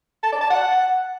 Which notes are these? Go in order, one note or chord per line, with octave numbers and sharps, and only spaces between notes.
A5
D5
A5
F#5